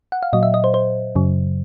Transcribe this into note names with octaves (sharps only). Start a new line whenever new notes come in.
F#5
F5
A#2 F#3 D#5
E5
D#5
C5
C5
F#2 C#3 F#3